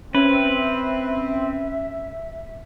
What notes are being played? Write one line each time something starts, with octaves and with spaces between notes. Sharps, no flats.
C4 C#4 B4 E5